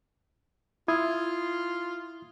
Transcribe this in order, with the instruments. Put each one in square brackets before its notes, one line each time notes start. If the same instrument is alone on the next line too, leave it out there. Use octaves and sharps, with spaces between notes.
[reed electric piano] E4 D#6 G#6 [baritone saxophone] F4